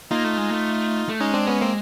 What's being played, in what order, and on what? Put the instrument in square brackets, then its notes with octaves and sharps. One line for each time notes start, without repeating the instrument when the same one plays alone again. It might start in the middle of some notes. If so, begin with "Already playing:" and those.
[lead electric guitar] A#3 [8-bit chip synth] D#4 F4
[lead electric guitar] A3
G#3
A3
A3
[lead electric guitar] G#3 [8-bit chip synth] C#4 D#4
[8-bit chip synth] C4 D4
B3 C#4
A#3 C4